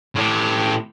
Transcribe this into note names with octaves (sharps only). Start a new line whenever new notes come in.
A2 G4